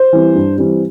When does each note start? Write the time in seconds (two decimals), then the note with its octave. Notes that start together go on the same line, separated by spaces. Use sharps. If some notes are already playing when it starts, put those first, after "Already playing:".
Already playing: C5
0.13 E3 G3 C4
0.35 G2
0.58 E3 G3 C4